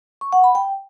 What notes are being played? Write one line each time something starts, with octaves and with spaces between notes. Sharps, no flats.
C#6
F#5
B5
G5